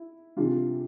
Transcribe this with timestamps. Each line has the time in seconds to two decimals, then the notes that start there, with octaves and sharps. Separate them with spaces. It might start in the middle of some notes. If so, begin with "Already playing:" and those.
Already playing: E4
0.36 C3 E3 G3 D4 F4